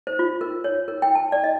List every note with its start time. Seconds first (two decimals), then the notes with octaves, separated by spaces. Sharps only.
0.07 C5
0.19 F4
0.41 A#4
0.64 C#5
0.88 A#4
1.02 G5
1.15 A5
1.32 D5
1.44 D#5